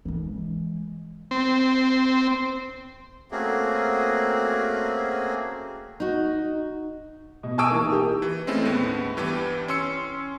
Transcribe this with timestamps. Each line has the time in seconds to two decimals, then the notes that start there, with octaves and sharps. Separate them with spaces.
0.05 E3 G#3
1.31 C4
3.31 A3 A#3 C4 C#4 F#4 G#4
6.00 D#4 F#4
7.43 B2
7.58 G#5 A5 C#6 D#6 E6 D7
7.69 D#3 E3 A#3
7.89 G4 A#4
8.22 E3
8.47 G#3 A3 C4 C#4 E4 A4
8.66 D#2 A2 B3
9.17 G2 E3 B3 G4
9.68 C#4 C6 E6 C#7